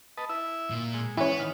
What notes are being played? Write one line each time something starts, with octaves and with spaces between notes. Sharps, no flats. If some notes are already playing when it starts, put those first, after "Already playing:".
B4 D#5 A5
E4 E5
A#2
G#3
G#2 E3 B3 C#4
D#3 F6